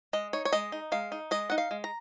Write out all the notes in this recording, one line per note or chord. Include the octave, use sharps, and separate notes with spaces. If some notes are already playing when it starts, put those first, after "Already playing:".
G#3 D#5
D#4 C#5
C#5
G#3 D#5
D#4
G#3 F5
D#4
G#3 D#5
D#4 F#5
F5
G#3
A#5